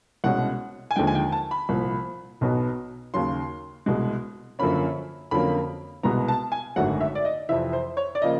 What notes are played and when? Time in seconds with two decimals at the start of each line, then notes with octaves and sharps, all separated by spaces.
0.24 C2 B2 G#3 C#4 F#5
0.91 G#5
0.96 D#2 D3 F3 G#3 G5
1.07 G#5
1.15 G5
1.32 A5
1.51 B5
1.69 C2 A#2 F3
2.41 B1 B2 F#3 B3
3.14 D#2 C#3 F#3 C6
3.86 C2 B2 G#3
4.59 F#2 D3 F3 A#3 C#4 B5
5.31 F2 D3 F#3 A#3 C#4 B5
6.03 C2 B2 G#3 B3 A#5
6.28 A5
6.52 G#5
6.76 G#1 F#2 D3 F#3 A3 F#5
7.01 E5
7.15 D5
7.25 D#5
7.49 F2 C3 E3 E5
7.73 C5
7.97 C#5
8.15 D5
8.22 C#3 F3 A#3 D#5